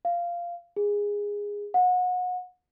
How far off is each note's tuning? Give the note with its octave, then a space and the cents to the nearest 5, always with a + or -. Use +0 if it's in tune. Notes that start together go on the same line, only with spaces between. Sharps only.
F5 -10
G#4 -15
F#5 -30